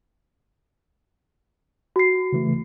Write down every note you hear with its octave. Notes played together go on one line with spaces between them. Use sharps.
F#4 C7
C#3 E3 A3